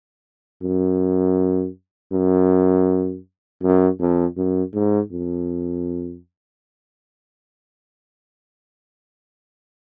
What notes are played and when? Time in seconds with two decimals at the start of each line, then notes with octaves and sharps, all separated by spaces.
0.63 F#2
2.12 F#2
3.62 F#2
4.00 F2
4.37 F#2
4.74 G#2
5.12 F2